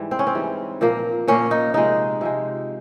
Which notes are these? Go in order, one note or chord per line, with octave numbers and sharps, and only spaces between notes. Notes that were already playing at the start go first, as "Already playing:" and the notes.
Already playing: G#2 E3 G3
C4
C#4
C4
G#2 E3 G3
A#2 F3 A#3
A#2 F3 A#3 C#4
D#4
C3 F3 G#3 D#4
C3 F3 G#3